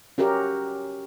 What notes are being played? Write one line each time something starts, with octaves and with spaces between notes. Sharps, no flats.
C#4 F#4 G4 A#4